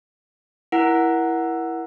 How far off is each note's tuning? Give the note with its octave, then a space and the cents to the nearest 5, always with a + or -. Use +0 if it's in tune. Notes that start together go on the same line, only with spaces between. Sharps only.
E4 +0 A#4 +20 F#5 +0